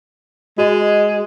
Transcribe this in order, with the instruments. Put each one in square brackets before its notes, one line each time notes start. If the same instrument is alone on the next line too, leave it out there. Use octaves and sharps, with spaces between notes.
[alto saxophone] G#3 [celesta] F#4 D#5